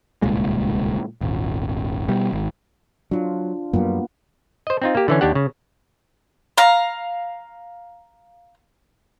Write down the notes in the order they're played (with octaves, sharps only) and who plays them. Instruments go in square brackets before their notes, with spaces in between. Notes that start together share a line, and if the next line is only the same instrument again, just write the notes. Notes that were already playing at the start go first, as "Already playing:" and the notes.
[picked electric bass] D1 C2 A#2 G#3
D#1 G#1
B2 G3
G#1
[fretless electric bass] F#3 [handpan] D4 F4
[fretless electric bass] F#2 F#3 G3 [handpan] A#3 B3 F4
[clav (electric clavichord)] C5 D#5
C4 D#4 F4
A#3 G4
D3 E3 C#4
D#2 D4 G4 F#5
C#3
[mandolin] F5 A#5